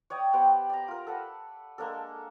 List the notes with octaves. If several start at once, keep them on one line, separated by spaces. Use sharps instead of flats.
C#5 D5 G5 D#6
B3 G4 C5 D5
D5 A#5
F4 A#4
A4 B4 F#5
G#3 A#3 D4 A4